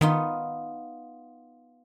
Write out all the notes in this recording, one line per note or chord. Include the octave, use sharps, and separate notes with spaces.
D#3 B3 D#4 F4